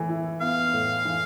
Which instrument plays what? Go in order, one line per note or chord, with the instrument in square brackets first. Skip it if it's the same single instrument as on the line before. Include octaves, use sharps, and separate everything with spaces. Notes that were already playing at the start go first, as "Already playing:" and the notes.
Already playing: [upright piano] A2 E3
E4
[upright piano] B3 [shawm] F5
[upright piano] A2
E3